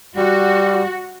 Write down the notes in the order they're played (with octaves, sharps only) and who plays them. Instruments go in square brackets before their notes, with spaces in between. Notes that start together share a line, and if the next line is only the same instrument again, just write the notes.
[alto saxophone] G3 [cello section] F#4